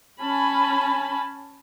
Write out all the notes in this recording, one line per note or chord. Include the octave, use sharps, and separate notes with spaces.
C#4 G#5 A5 B5